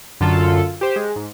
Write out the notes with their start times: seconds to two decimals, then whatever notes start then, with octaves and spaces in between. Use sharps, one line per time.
0.21 F#2 D3 F4 A4
0.81 G4 C5
0.96 G#3
1.16 G#2